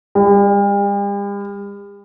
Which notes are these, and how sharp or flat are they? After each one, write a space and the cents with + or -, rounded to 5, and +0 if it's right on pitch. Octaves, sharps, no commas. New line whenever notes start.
G3 +45